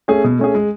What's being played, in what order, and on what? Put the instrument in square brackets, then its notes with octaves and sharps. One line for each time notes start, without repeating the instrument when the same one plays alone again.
[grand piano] A3 C#4 G#4
B2
A3 C#4 G#4
G#3